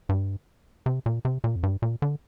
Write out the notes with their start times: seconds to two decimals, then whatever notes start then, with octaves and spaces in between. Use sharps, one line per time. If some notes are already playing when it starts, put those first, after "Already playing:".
0.09 G2
0.86 C3
1.06 A#2
1.25 C3
1.44 A#2
1.56 F2
1.63 G2
1.82 A#2
2.02 D3